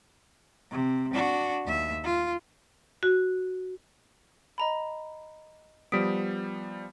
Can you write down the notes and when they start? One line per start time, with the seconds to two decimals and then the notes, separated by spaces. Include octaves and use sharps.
0.71 C3
1.14 D4 F#4
1.66 D#2 E5
2.04 F4
3.03 F#4
4.58 D#5 A#5 B5
5.92 F3 G3 B3 D#6 B6 D7